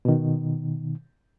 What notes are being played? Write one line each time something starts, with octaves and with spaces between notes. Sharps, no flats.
B2 D#3